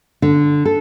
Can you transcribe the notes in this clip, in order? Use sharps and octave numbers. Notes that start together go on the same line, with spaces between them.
D3
A4